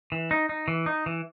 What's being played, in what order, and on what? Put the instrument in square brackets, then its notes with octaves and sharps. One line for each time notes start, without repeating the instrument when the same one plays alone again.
[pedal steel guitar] E3
D#4
D#4
E3
D#4
E3